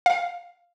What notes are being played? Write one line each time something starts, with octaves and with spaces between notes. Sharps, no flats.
F5